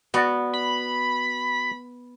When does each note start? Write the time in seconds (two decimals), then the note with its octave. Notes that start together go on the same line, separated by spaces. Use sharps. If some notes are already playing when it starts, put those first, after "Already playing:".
0.14 B3 F#4 D5 F#5
0.53 B5